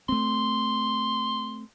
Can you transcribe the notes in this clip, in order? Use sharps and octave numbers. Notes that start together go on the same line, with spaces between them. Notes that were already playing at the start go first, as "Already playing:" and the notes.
A3 C4 C6